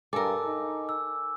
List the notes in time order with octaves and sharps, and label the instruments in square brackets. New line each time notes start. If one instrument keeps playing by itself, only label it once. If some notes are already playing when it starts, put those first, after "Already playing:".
[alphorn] G2 [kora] A4 A#4 [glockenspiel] G#5 D6
[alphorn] D#4
[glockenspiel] E6